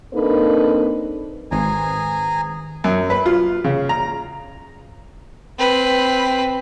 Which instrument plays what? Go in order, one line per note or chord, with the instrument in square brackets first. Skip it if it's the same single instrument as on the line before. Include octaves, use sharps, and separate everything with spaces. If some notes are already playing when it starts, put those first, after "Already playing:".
[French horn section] A#3 C4 D4 D#4 A4 B4
[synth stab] G#1 [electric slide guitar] D#3 B4 C5 [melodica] G#4 G#5 A#5
[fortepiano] F#2
B4
F4
C#3
A#5
[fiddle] C4 B4